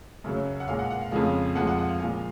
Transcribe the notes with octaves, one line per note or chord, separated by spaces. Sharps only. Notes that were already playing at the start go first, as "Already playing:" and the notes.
F#2 C#3 F#3
F#5
A#2 G#3 F5
F#5
F#5
F5
F2 C#3 F3 G#3 F5
F2 F3 G#3 F#5
F#5
F#5
F5
A#2 F3 G#3 F5